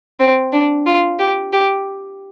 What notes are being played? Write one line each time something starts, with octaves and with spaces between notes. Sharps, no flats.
C4
D4
F4
G4
G4